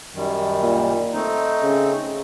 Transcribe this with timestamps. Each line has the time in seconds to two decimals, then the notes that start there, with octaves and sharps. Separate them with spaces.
0.13 F#2 D#3 G3
0.63 A#2
1.13 A3 C4 D#4
1.63 C#3